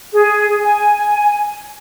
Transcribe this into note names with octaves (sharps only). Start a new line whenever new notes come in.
G#4
G#5